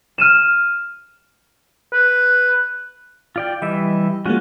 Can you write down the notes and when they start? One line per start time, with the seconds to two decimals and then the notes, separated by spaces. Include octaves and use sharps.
0.18 F6 D#7 E7
1.92 B4
3.36 F4 D5 G5
3.62 E3 G3 D#5 E5
4.26 F3 G#3 A#3 C#4 F4 F#4